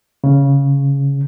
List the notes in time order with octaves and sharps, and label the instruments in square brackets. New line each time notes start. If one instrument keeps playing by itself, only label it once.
[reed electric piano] C#3